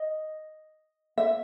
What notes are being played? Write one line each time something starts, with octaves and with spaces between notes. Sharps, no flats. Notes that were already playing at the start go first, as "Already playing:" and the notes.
Already playing: D#5
E5